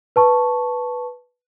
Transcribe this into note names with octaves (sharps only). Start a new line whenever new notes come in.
B4 A5 C#6